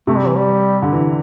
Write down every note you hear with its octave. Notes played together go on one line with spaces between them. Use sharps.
C3 A3
G3
E3
G3
D3
E3